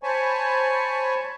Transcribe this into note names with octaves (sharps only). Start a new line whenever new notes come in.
C5 C#5 G#5 A5 B5 C#6